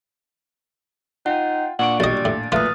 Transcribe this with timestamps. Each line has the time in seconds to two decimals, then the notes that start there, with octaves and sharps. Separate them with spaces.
1.26 D#4 F4 F#5 G5
1.79 A#2 D4 D5 F#5 C#6 D7
2.00 B1 G3 D#5 A6
2.25 A2
2.52 B1 A#2 A3 F4 B4 D#6 F6 A6